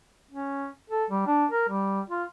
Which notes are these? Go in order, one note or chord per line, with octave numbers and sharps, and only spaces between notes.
C#4
A4
G3
D4
A#4
G3
F4